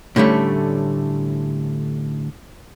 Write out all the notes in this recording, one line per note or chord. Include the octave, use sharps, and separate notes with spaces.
A2 D3 G3 A3 C#4